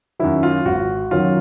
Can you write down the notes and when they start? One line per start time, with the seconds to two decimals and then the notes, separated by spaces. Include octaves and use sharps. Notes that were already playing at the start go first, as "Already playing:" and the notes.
0.19 F#2 D#3 F#3 E4
0.43 F4
0.65 G#1 F#4
1.11 F#2 D#3 F#3 F4